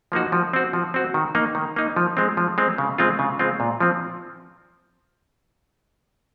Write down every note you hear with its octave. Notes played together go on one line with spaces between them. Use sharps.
F3 A#3 D#4 F#4
F3
C4 F#4
F3
C4 F#4
D#3
A#3 D#4
D#3
A#3 D#4
F3
G#3 C4
F3
G#3 C4
C#3
G#3 C4 F4
C#3
G#3 C4 F4
A#2
F3 C4